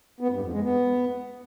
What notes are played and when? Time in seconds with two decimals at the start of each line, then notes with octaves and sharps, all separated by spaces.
0.20 B3
0.31 G2
0.41 F2
0.52 G#3
0.62 B3